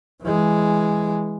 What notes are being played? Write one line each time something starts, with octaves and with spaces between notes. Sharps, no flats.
E3 G#3